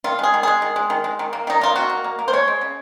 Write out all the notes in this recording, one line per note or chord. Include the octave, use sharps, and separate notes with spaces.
D#3 F4
G#3 G#4
D#3
G#3 G#4
D#3
G#3
D#3
G#3
D#3
A#3
D#3 D#4
A#3 F4
D#3 F#4
A#3
A#3
A#3
C5
G#3 C#5
G#3
C#3